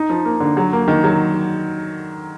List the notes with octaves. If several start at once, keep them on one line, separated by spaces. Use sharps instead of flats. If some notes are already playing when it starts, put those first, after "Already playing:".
Already playing: D#4
F3
A#3
D3
F#3
A#3
D#3
F#3